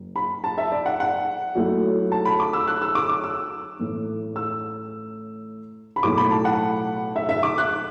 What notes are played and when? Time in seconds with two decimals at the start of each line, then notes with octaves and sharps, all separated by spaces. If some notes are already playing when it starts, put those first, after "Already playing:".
Already playing: F#1
0.16 B5
0.44 A5
0.58 E5
0.72 D5
0.86 F#5
1.00 F#5
1.55 F#2 F#3 A3 E4
2.12 A5
2.25 B5
2.40 D6
2.53 E6
2.67 F#6
2.82 E6
2.95 D6
3.09 D6
3.24 E6
3.79 A1 A2 A3
4.36 E6
5.96 B5
6.03 B1 A2 A3 E4 D6
6.17 B5
6.31 A5
6.45 F#5
7.16 E5
7.29 E5
7.43 D6
7.58 F#6